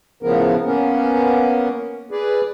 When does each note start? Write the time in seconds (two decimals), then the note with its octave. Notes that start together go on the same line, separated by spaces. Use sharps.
0.23 A2 C#3 F3 B3 A#4
0.65 A#3 B3 C#4 A#4
2.11 G#4 B4 D5